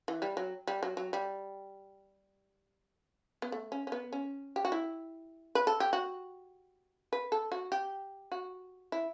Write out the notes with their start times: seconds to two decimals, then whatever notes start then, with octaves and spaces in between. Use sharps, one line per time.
0.08 E3
0.22 G3
0.37 F#3
0.68 G3
0.83 F#3
0.97 F#3
1.13 G3
3.42 B3
3.52 A3
3.72 C#4
3.87 C#4
3.92 B3
4.13 C#4
4.56 G4
4.65 F#4
4.72 E4
5.55 B4
5.67 A4
5.80 G4
5.93 F#4
7.13 B4
7.32 A4
7.52 F#4
7.72 G4
8.32 F#4
8.92 E4